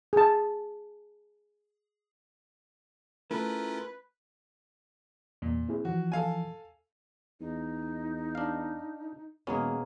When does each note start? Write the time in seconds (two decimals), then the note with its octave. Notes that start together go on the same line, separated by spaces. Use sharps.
0.13 G#4 A5
3.31 A3 C#4 E4 F4 A#4 B4
5.42 E2 A#2
5.69 C4 E4 G#4
5.85 E3 F3 F#4
6.12 A4 F5 G#5
7.40 E2 D#4
8.35 D4 F5
9.47 E1 B2 A#3 B3 C#4 G#4